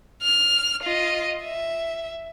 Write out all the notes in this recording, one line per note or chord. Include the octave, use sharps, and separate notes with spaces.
F6
F4 D#5
E5